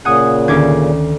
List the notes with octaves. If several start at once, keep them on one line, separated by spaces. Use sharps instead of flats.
A#2 C#3 F#5 G#5 D#6
D2 D#3 C#4 D6 G#6